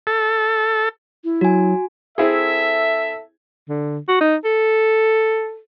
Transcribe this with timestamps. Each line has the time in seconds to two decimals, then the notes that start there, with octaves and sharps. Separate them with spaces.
0.07 A4
1.24 E4
1.41 F#3 F#4 G#5
2.18 C4 E4 G#4 A4 E5
3.69 D3
4.08 F#4
4.21 D#4
4.45 A4